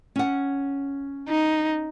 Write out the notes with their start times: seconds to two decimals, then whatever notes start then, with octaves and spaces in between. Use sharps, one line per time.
0.16 C#4 F#5
1.29 D#4